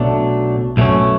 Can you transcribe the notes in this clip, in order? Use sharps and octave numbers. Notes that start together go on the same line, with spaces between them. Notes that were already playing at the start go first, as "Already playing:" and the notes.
Already playing: B1 B2 F#3 A3 D4
B1 B2 A3 C#4